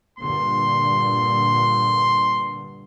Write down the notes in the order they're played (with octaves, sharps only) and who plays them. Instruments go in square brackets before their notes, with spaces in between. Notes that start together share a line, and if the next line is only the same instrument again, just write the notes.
[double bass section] G2 A#2 D3 [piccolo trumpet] C6